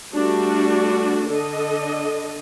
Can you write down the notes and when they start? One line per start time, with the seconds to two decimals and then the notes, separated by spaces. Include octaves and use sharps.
0.14 G3 A3 D4 F#4
1.28 D3 D4 A4 D#5